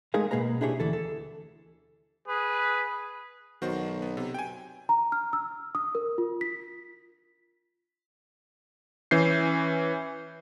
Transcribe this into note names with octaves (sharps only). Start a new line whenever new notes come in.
G#3 A3 D#4 G#4 A#4 F5
B2 A#3 G#4 B4 A#5
D4 E4 G4 G#4 C#5
D2 E3 A4
A4
G#4 B4
B1 D#3 F#4 C5
B3
C3
G5 G#5
A#5
F6
E6
D#6
A#4
F4
B6
E3 C#4 G6 C7